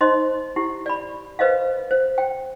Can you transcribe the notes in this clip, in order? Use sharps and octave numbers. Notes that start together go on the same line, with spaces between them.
D#4 C5 D#5 C6
E4 G4
D5 B5
B4 C5 D#5 F5
C5
G5